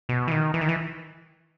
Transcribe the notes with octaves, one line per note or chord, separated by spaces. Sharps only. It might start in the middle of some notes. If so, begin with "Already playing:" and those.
B2
E3
D#3
E3
D#3
E3